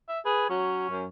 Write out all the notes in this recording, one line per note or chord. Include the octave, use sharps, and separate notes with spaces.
E5
G#4 B4
F#3 C#4
F#2